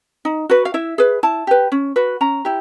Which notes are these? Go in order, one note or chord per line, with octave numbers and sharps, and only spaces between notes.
D#4
F#4 B4
F5
E4 E5
G#4 B4
E4 A5
G4 B4
C#4
F#4 B4
C#4 A#5
E4 G4